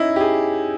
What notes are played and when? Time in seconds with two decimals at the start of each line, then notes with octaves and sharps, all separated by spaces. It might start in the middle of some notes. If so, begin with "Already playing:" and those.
Already playing: C#4 D#4 E4
0.16 G4
0.21 G#4